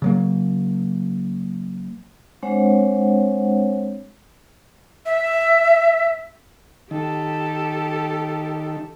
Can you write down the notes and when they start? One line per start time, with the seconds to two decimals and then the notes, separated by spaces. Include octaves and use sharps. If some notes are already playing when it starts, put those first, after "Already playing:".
0.02 C#3 F#3 A#3
2.43 G#3 C4 D4 C5 C#5 F#5
5.06 E5
6.91 D#3 G4 A4